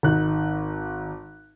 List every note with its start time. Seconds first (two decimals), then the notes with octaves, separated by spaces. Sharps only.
0.03 G#1 D#4 F#6